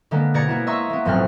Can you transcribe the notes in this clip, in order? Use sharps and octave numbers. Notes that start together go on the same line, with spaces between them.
D3 G#3 A#3 B3
B2 D5 A#5 G#6 C#7
A#3 B3 E4
D#5 E5 A#5 C6 C#6 E6
A#3 B3
F1 B1 A2 C4 C#4 F6